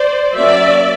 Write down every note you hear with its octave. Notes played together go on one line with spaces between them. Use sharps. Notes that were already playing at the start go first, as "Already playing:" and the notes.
Already playing: C5 D5
F#3 A#3 C#4 D5 E5